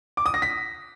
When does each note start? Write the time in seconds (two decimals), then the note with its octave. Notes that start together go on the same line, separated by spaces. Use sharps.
0.17 D6
0.26 D#6
0.34 A#6
0.42 B6